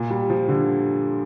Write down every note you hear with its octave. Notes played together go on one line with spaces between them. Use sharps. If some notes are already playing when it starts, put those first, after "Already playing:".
Already playing: A#2
G3
F3
D3